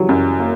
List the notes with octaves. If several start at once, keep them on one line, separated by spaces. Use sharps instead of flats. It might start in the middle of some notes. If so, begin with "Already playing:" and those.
Already playing: C#3 E3 F#3 G3
F#2
A#3